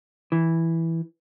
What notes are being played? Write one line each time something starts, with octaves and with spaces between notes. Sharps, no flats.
E3